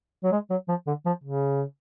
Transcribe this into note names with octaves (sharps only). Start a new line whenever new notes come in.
F#3
G#3
F#3
F3
D3
F3
C#3